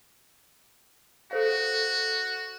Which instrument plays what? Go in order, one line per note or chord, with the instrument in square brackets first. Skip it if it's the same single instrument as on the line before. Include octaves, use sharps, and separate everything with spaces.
[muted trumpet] F#4 [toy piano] A4 C5 F5